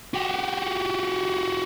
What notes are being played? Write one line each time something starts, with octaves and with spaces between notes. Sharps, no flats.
F#4 G4